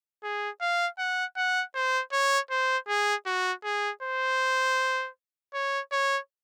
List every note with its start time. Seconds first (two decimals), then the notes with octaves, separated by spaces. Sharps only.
0.23 G#4
0.61 F5
0.99 F#5
1.37 F#5
1.75 C5
2.13 C#5
2.51 C5
2.88 G#4
3.26 F#4
3.64 G#4
4.03 C5
5.54 C#5
5.92 C#5